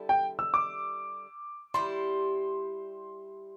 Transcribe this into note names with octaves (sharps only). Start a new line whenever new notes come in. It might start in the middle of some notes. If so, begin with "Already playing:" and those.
Already playing: D3 G3 E4 A4
G5
E6
D6
G3 E4 G4 C6